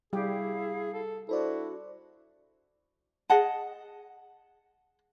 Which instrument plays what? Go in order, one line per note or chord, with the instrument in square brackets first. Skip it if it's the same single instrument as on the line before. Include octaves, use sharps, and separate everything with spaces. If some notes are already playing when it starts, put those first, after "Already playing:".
[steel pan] G3 G4 [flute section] E4 F5 [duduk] G#4
[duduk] A4
[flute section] D4 F#4 [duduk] E4 [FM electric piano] A4 C5 D5
[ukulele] G#4 D#5 F#5 A5